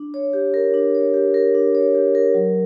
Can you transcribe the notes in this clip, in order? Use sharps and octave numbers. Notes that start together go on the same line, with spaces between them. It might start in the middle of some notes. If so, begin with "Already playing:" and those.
Already playing: D4
C#5
G4
A#4
D4
C#5
G4
A#4
D4
C#5
G4
A#4
F#3